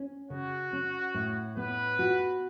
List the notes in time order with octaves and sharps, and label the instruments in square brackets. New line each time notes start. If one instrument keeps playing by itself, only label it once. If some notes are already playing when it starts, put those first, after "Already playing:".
Already playing: [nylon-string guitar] C#4
[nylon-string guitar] C#3 [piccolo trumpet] F#4
[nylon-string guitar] C#4
A2
[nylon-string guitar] B3 [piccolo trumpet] B4
[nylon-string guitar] F#4